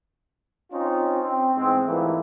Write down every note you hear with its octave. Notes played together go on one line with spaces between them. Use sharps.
C4 C#4 D#4 F4
C4
E2 G#2 G#3 C4
G#2 E3 F3 G3 A3 A#3